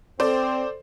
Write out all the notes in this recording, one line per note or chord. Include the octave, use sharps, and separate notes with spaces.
C4 A4 C5 D5